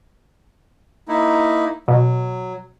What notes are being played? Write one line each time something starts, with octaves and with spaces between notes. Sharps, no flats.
A#3 D#4 E4
B2 F#3